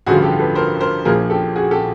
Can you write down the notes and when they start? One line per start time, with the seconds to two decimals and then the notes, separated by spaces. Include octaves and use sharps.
0.06 A1 G2 D3 F3 F#4 G#4
0.22 G4 A4
0.39 A4 B4
0.55 A#4 C5
0.81 A#4 C5
1.05 A#1 A#2 F3 G#4 A#4
1.30 G4 A4
1.56 F#4 G#4
1.71 G4 A4